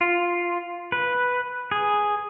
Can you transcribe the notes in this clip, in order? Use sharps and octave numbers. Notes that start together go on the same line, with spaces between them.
F4
B4
G#4